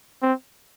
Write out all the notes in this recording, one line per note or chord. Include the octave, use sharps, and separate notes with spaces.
C4